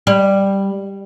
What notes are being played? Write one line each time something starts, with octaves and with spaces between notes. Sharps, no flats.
G3